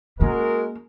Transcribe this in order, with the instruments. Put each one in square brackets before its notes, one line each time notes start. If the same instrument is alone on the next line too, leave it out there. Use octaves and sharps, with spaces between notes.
[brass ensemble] G#3 F#4 A#4 [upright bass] A#3 C#4